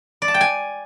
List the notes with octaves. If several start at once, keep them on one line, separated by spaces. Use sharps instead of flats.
D5
A5
G5
G#5